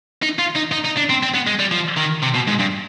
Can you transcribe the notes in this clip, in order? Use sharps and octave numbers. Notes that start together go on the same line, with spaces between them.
D#4
F4
D#4
D#4
D#4
D4
C4
C4
B3
G#3
G3
F3
D#3
C3
B2
G#2
G2